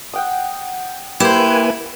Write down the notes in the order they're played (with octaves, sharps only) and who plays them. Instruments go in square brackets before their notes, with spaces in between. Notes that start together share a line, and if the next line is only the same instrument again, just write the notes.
[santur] F#5 G5 D#6
[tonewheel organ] A#3 B4 G#5 [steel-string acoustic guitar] E4 [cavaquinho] G4 C5